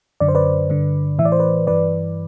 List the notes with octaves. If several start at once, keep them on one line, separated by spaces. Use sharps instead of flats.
F#2 D3 D5
C5
B4 D5
G2 D3
A2 E3 E5
D5
C5
B4 D5
G2 E3 B4 D5